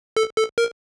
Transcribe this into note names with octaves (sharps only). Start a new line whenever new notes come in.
A4
A4
A#4